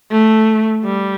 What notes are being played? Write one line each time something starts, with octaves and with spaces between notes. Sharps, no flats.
A3
G3